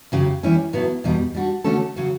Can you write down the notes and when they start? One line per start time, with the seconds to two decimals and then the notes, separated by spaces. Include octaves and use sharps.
0.12 F#2 C#3 F#3 C#4 G4
0.43 E3 G3 C#4 E4
0.73 A2 F#3 B3 E4 B4
1.04 E2 B2 G3
1.34 G3 D4 F#4
1.64 D3 A3 C#4 F#4 A4
1.96 C#3 F#3 C#4 F#4